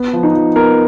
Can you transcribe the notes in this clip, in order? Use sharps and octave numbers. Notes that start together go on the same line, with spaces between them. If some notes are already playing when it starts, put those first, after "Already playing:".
Already playing: B3
F3
D#4
F3
B3 A#4